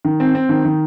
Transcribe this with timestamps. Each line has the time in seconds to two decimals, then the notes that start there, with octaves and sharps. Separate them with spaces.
0.05 D#3
0.20 C4
0.35 C4
0.49 D#3
0.65 D#3